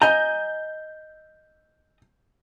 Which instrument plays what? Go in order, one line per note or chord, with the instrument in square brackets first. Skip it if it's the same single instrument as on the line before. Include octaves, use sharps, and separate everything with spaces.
[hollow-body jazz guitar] D#5 G#5 A#5 [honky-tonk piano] G6